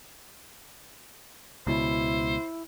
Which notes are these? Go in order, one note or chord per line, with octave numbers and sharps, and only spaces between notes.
C#2 B2 E4 C5